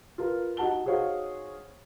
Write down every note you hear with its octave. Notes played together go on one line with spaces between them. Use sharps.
F4 A#4 B4
D#4 F#4 F#5 A5 G7
D#4 F#4 G#4 C5 C#5 F5